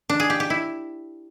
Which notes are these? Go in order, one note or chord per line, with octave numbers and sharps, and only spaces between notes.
D4
G#4
G4
G4
E4